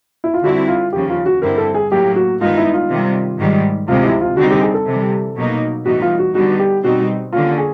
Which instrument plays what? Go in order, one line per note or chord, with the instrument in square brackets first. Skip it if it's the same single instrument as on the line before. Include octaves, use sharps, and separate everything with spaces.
[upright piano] E4
F4
[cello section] D3 G3 C4 E4 [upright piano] F#4
[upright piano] F4
[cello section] D#2 C#3 F3 [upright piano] G4
[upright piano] F4
F#4
[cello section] G2 D3 G3 C4 E4 [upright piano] A#4
[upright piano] A4
G#4
[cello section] A2 F#3 A#3 [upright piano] G4
[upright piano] F#4
[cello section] G2 D#3 G#3 B3 D#4 [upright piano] F4
[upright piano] E4
F4
[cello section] C3 D#3 G3
G#2 D#3 G3
[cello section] D2 C3 F3 G#3 [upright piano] F4
[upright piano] E4
F4
[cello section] D3 G3 C4 D#4 [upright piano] F#4
[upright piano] G4
G#4
A4
[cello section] C3 E3 G3
B2 F#3 A#3 D#4
[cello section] A2 E3 G3 B3 D#4 [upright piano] F#4
[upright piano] F4
F#4
[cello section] D3 G3 B3 D#4 [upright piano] F#4
[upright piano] G4
[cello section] B2 G3 C4 D#4 [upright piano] F#4
[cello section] D3 G3 A#3 C#4 [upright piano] F4
[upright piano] G#4